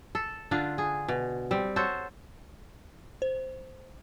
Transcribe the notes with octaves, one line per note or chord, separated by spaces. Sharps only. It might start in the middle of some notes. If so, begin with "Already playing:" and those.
A4
D3 D4 F4
G#4
B2
G3 C4
F#4 A4 C5 C#5
C5